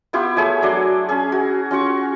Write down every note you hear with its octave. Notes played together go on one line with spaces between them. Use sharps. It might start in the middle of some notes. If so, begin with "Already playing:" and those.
B3 E4 F4 G4
A3 G#4 C#5 E5
F#3 D4 D5 C6
C#4 G#4
F#4
C#4 F4 F#4 C#6